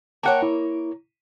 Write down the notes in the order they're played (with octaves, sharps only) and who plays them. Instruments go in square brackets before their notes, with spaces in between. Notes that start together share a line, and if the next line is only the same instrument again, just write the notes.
[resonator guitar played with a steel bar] A#3 A#4 C#5 [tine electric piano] F#5 G5 A5
[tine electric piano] E4